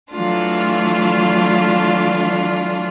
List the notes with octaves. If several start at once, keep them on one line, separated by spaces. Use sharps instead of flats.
E3 F#3 A3 D4 F4